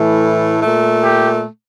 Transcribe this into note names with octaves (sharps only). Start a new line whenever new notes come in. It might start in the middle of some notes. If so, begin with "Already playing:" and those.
Already playing: A2 E3 A3
A#2 A3
G4